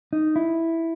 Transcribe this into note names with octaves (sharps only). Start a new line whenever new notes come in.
D#4
E4